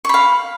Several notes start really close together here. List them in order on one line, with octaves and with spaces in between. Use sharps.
C#6 B5 F5